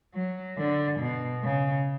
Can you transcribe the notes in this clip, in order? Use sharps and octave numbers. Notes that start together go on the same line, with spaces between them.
F#3
D3
B2
C#3